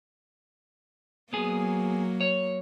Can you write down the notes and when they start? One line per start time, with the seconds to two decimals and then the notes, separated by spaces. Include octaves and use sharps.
1.33 F#3 A#3 B3 G#4
2.21 C#5